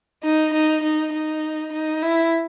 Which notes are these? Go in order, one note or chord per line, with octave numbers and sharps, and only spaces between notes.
D#4
D#4
D#4
D#4
D#4
E4